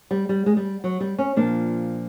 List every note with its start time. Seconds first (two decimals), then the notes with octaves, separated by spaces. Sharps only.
0.11 G3
0.29 G3
0.46 G#3
0.57 G3
0.84 F#3
1.01 G3
1.19 C#4
1.36 A#2 F3 D4